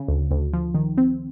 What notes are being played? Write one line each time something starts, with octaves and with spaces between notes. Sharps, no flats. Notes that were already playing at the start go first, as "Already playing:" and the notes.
Already playing: C#3
D2
D2
F3
D#3
C4